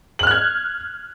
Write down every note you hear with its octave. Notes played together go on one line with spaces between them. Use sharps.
F6 F#6 G#6 F#7